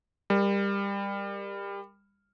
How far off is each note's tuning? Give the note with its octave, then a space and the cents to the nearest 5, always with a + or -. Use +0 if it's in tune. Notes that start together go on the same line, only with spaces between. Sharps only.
G3 +25 A#4 +0